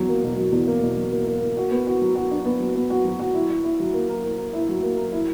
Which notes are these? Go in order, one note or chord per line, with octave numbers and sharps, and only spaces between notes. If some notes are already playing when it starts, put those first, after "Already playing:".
Already playing: E2 F#3
A#3
B2
F#3
E2
A#3
B2
F#3
A#3
A#3
A#3
F#4
B3
F#4
F#3
F#4
D4
B3
F#3
B3
F#4
F#3
F#4
E4
E4
E4
F#3
A#3
A#4
A#3
A#4
E4
F#3
A#3
A#4
E4